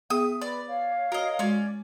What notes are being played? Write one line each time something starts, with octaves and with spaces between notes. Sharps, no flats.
B3 G#4 E5 D#6
B4 D5
C#5 F5
F#4 A#4 D#5
G#3 C#4 F#4 D5